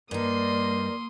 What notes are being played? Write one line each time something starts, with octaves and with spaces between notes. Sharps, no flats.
G2 A#3 D#4 A#4 D5 C6 D#6